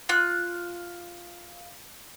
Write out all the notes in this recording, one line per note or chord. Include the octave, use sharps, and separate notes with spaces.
F4 F#6